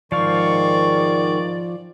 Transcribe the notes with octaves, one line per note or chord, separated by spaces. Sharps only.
G#2 D#3 F3 D5 F5 C#6